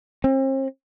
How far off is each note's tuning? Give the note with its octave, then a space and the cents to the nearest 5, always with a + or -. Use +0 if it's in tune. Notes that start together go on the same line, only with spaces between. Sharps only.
C4 +40